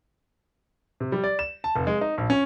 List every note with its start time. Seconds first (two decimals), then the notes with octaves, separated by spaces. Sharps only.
1.00 C3
1.12 G3
1.24 D5
1.39 E7
1.64 A5
1.76 F1
1.87 G#3
2.01 D#4
2.18 A#1
2.30 C#4